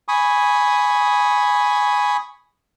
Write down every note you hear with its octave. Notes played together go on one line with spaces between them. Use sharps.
G#5 B5 C#6 D#6